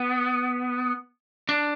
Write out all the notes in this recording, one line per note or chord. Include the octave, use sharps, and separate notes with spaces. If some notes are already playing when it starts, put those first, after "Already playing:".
Already playing: B3
D4